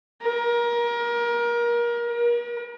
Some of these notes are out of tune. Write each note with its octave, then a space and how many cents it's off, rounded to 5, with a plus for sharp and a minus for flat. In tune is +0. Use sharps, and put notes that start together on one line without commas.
A#4 +25
A#4 +45